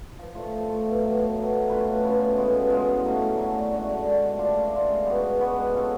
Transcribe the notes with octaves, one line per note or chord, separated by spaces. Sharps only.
F3
A3 F4
F3
A3 F4
B2
F#3 A3
B2
F#3 A3
A3
C#4 F4 B4
A3
C#4 F4 B4
B2
G#3 B3 F4
B2
G#3 B3 F4
A2
F#3 A3 C#4
A2
F#3 A3 C#4
D3
G#3 D4 F#4
D3
G#3 D4 F#4
A3
D4 F4
A3
D4 F4
G#3
B3 F#4
G#3
B3 F#4
G#3
C#4 F4 A4